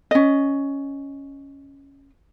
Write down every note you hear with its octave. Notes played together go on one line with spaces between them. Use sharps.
C#4 D#5